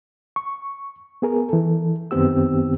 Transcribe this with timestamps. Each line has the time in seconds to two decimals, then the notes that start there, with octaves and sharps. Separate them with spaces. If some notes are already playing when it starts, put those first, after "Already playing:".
0.36 C#6
1.22 B3 G#4 A#4
1.49 E3 A4
2.11 F#2 D#3 B3 C4 G4 E6